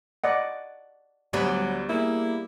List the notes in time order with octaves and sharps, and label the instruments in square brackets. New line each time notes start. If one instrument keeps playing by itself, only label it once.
[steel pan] D5 D#5 F#5
[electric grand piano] D2 [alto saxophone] F#3 [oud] G3 B3
[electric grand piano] A#3 G#4 [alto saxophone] E4